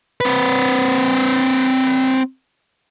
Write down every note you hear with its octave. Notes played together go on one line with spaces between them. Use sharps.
C4 B4